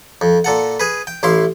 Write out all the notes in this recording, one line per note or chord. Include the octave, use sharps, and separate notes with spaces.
F2
A#2 A4 F#5
G#4 B4
G5
A1 E4 F5 C6